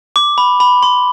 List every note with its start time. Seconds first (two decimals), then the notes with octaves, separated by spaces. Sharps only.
0.16 D6
0.38 B5
0.60 B5
0.83 C6